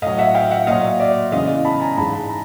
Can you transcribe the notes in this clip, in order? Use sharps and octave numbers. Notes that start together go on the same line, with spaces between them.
A2 F#3 D#5 F5
E5 F#5
F5 G5
E5 F#5
A#2 F#3 D#5 F5
D5 E5
E2 C#3 E3 G#3 D#5 F5
A5 B5
G#5 A#5
G#2 E3 G#3 A5 B5
A#5